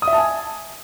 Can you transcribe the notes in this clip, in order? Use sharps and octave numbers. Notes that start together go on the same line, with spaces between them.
D#6
E5
A5
G#5